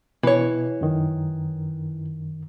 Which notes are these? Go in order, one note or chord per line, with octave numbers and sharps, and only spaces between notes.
B2 E3 C#5
F#2 D#3